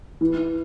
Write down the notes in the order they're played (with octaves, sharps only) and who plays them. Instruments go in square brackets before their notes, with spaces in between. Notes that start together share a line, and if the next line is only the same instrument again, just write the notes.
[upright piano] E3